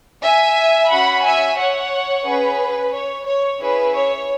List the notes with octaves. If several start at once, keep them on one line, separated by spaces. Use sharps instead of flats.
E5 G#5
C#4 F#4 F#5 B5
E5 G#5
C#5 F#5
C#4 G#4 B4
C#5
C#5
C#4 E4 G#4 B4
C#5